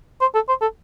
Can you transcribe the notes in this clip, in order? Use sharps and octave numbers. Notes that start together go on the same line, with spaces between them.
C5
A4
C5
A4